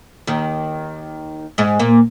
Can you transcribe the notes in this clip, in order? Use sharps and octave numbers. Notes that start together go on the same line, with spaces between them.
D#2 D#3
G#2 G#3
A#2 A#3